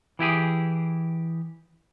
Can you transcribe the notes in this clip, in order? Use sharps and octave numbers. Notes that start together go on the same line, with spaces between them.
E3 E4 G4 G#4